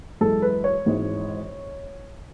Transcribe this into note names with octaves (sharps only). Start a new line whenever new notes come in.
F#2 E3 G#3 A4
B4
C#5
G#1 G#2 E3 G#3